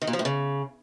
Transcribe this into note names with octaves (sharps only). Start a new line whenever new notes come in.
D#3
A#2
F3
A2
C#3